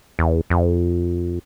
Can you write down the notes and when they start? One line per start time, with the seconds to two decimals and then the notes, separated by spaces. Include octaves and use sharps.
0.19 E2
0.50 F2